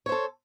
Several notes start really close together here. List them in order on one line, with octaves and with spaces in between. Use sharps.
C#5 C5 A4